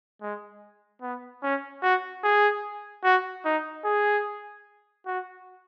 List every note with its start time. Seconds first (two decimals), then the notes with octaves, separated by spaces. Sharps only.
0.22 G#3
1.02 B3
1.43 C#4
1.82 F#4
2.24 G#4
3.04 F#4
3.45 D#4
3.85 G#4
5.06 F#4